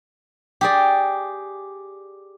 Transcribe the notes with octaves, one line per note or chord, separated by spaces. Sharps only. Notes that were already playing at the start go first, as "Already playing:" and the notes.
G4 G#4 D5